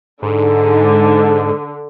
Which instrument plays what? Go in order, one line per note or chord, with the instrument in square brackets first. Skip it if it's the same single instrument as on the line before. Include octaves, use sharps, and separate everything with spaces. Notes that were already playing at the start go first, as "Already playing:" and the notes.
[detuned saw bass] G#2 [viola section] D3